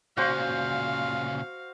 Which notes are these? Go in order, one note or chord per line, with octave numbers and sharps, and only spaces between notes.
A#2 C#3 F#4 C5 F5